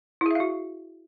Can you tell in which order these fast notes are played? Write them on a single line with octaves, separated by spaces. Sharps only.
E4 G#4 E5 F5 F#4